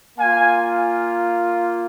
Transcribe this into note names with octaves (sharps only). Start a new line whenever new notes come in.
A#3 F4 F5 G#5